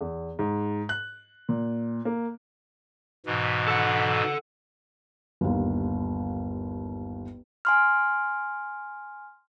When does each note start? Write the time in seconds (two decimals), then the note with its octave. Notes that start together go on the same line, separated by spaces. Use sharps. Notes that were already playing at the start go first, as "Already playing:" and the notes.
0.01 E2
0.39 G#2
0.89 F#6
1.49 A#2
2.05 A#3
3.26 G#2 B2 E3
3.68 A4 F#5
5.41 G1 D#2
7.65 G#5 C6 F6